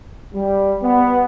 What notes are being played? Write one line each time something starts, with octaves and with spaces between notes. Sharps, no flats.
G3
B3